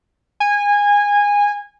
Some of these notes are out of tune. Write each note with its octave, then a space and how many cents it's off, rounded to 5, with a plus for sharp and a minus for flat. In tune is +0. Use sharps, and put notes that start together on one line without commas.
G#5 -20